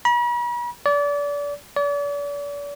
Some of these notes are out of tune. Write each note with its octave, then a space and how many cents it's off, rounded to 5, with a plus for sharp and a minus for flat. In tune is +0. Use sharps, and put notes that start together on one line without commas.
B5 -45
D5 -30
D5 -40